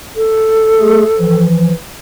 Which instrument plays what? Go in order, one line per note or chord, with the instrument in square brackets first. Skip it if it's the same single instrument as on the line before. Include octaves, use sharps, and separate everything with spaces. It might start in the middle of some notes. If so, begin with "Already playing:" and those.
[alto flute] A4
[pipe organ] A3 G#4
E3 F3